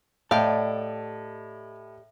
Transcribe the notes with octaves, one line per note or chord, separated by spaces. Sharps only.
A2 G4 A4 D5 D#5 F5 G5